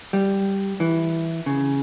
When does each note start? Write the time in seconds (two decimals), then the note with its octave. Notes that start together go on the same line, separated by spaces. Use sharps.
0.13 G3
0.80 E3
1.46 C#3